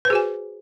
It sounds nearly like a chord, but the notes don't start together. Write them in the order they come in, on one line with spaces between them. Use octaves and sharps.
B4 C5 G#4 F#4 G#5